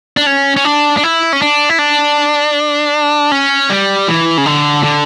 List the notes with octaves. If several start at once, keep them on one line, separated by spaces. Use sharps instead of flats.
D4
C#4
C#4
D4
D4
E4
C#4
D4
E4
D4
C#4
G3
E3
C#3
D3
D3